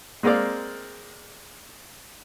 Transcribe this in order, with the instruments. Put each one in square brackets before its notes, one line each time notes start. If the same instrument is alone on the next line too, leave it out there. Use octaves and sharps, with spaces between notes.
[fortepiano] G#3 A#3 C4 A#4 D5